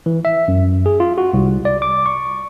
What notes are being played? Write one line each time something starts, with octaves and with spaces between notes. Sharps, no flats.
E3
E5
F#2
G#4
F4
F#4
C2
D5
D6
C#6